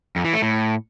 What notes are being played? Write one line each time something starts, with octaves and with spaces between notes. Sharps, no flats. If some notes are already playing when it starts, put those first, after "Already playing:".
F2
E3
A3
A2